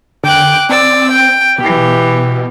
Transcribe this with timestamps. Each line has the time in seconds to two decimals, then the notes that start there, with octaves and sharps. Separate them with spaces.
0.24 D3 G5 D6 F#6
0.69 C4 D5 E6
1.11 G5
1.58 B2 E3 G4